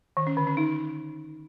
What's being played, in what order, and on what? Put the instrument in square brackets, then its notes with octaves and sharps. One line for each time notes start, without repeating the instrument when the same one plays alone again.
[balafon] D#3
C#4
D3
C#4
D#4